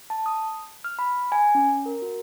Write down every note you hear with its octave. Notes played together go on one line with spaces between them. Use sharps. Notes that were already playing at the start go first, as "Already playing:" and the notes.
A5
D#6
F6
B5
G#5
C#4
A#4
F#4